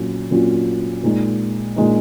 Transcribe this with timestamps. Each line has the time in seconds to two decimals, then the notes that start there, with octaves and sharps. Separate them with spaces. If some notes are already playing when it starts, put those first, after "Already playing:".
Already playing: A#2 F#3 C#4 F4
0.31 A#2 F#3 C#4 F4
1.03 A#2 G#3 D#4
1.76 A#2 G#3 D#4